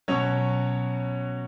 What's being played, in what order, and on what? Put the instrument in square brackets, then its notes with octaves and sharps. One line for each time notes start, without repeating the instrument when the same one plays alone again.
[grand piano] B2 F#3 C#4 C#5